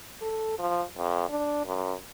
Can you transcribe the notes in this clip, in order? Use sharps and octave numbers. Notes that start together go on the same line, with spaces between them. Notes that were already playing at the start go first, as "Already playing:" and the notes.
A4
F3
F2
D4
F#2